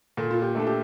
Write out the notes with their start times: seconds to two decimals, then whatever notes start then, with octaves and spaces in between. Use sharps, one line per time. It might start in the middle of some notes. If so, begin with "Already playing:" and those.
0.17 A#2 A4
0.31 F4
0.42 G4
0.55 A3 D4 A4
0.67 G4